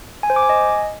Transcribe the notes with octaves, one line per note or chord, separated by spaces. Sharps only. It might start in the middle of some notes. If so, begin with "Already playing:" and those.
G#5
C5
D6
G#5
D#5